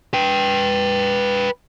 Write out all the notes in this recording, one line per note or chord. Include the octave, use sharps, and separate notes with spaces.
B4 G5